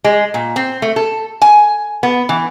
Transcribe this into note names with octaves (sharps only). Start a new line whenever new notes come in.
G#3
A#2
C4
A3
A4
G#5
B3
E3